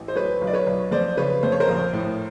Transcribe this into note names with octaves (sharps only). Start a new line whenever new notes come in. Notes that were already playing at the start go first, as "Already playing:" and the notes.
Already playing: A1
C5
F#3 B4 C#5
B1
D5
B4 C#5
B1
F2 C5 D5
C#3 B4 C#5
F2 C5
C#5
A#4 C5
A#1
A2